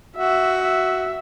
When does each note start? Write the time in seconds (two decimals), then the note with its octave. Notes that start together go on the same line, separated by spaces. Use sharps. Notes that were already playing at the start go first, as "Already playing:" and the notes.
0.16 F#4 E5
0.62 E5